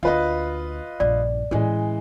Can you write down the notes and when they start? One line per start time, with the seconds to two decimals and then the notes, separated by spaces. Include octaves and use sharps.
0.03 D2 A#3 F4 B4 D#5
1.00 A#1 G2 D5
1.51 A2 E3 G#3 C#4